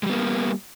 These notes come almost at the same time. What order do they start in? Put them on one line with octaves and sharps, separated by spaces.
G#3 G3 B3 A#3